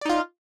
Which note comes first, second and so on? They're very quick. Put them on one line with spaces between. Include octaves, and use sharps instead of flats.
D5 D#4 F4